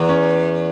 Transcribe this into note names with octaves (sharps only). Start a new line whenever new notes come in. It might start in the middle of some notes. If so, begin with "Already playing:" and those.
Already playing: E2
C#4